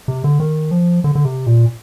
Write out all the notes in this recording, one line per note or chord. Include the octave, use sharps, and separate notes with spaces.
C3
D3
D#3
F3
D3
D3
C3
A#2